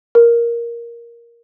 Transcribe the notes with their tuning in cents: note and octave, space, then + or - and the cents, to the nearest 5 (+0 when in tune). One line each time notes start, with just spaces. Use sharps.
A#4 +10